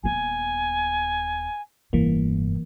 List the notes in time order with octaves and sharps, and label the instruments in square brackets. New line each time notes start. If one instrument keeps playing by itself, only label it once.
[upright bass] D#1 B3 [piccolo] G#5
[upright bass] F1 G2 [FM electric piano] E3 A#3